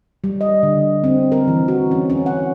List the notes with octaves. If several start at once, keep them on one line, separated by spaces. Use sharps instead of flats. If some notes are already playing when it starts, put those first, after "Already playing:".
G3
D#5
D3
C4
A#4
E3
F#4
C#4
C#4
F#5